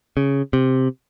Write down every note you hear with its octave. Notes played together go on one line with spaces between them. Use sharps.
C#3
C3